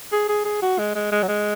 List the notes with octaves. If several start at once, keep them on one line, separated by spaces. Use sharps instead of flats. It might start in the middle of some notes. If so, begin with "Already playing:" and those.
G#4
G#4
G#4
F#4
G#3
G#3
G#3
F#3
G#3